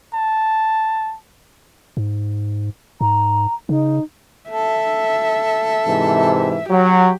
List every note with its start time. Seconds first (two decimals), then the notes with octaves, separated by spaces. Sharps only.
0.14 A5
1.97 G#2
3.01 G#2 A#5
3.69 C#3 D#4
4.50 A4 E5
5.87 G#2 C3 E3
6.70 F#3 G4